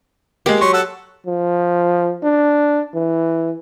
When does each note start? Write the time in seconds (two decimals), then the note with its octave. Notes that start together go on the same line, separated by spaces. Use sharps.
0.46 G#3 A#3 G4
0.61 F#3 C6 C#6
0.73 A4 F#5 E6
1.27 F3
2.24 D4
2.94 E3